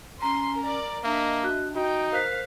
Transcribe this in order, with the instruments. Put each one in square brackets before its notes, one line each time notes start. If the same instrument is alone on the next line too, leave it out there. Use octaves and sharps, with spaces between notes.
[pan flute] C#4 [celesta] A#5 [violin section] C6
[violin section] A#4 D5
[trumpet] A#3 [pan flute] D4 [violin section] D#5 E5
[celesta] F#4 F#6
[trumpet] D#4 [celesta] F#4 [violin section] G5
[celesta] A#4 F#6 B6 [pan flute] C5 [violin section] F5